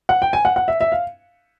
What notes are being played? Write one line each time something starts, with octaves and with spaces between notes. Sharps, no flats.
F#5
G5
G#5
F#5
F#5
E5
E5
F5